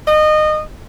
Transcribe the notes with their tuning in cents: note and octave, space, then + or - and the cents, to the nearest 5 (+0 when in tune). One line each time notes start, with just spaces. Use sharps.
D#5 -25